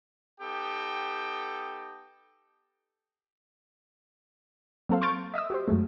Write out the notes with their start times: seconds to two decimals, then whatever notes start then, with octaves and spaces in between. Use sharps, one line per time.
0.41 B3 D#4 G4 A4 G5 D#6
4.89 F#3 A#3 C4 A4 C5 F5
5.01 C6 C#6 F6 G6 A6 D7
5.34 D#5 E5 D#6 E6
5.50 F#4 G4 C5
5.68 F#2 F#3 G#3 A3